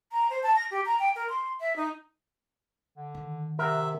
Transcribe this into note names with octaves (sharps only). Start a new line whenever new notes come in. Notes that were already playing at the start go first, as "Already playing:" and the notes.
A#5
C5
A5
A#6
G4
A#5
G5
A#4
C6
E5
D#4
D3
D#3
C3 A#4 E5 F#5 A#5